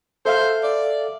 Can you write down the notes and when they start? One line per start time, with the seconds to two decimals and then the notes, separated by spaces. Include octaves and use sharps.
0.26 A4 C5 E5 F5
0.64 D5